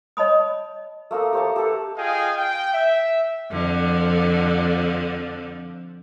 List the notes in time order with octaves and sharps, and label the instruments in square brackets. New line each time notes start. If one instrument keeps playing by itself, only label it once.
[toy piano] C#5 D#5 A5 B5 D#6
[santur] A3 A#3 D#5 E6
G4 C#5 D#5 A5
G4 A4 B4
[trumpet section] F4 G#4 D#5 F5 G5 G#5
G5
E5
[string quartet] F2 D3 F3